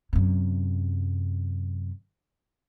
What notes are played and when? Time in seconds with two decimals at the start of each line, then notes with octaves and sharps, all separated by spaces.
0.13 F#2 C3